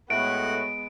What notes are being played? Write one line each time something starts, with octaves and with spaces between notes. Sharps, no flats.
A2 G#3 B3 F#4 F#5 D7